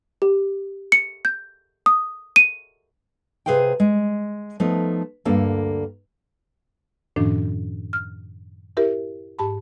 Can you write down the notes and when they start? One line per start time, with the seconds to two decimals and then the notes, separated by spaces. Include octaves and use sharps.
0.22 G4
0.92 C#7
1.25 G6
1.86 D#6
2.36 D#7
3.46 C3 G#4 B4 C5 F5 G5
3.80 G#3
4.60 F3 A3 B3 D#4
5.25 D2 G2 A#3 D4 A4
7.16 F#2 A2 D#3 F3 C#4 D4
7.93 F6
8.77 E4 G4 A#4 E5
9.39 G#2 G4 A5 B5